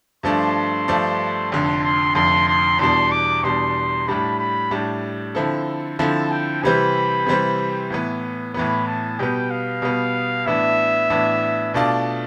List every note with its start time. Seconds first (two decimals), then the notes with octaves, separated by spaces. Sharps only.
0.23 G2 F3 A3 D4 C6
0.88 G2 F3 A3 D4
1.51 F1 F2 D3 C6
1.84 C6
2.15 F1 F2 D3 C6
2.48 C6
2.79 E2 B2 G3 D4 C6
3.11 D6
3.43 E2 B2 G3 D4 C6
4.07 A2 G3 D4 B5
4.39 B5
4.71 A2 G3 D4
5.35 D3 F3 C4 E4 A4
5.99 D3 F3 C4 E4 A4 A5
6.31 G5
6.63 C3 E3 G3 C4 B5
7.26 C3 E3 G3 C4
7.90 A2 E3 B3
8.54 A2 E3 B3 B5
8.87 A5
9.19 B2 G3 B3 G5
9.50 F5
9.82 B2 G3 B3
10.46 A2 E3 B3 D4 E5
11.10 A2 E3 B3 D4
11.74 B2 A3 D4 F4 D5